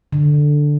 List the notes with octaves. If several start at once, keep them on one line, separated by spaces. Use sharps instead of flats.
D3